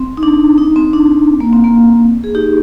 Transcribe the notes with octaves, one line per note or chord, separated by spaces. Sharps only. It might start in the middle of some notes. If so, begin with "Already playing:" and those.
Already playing: C4
D#4
D4
D#4
C4
D4
A#3
C4
A#3
G#4
D#4 G4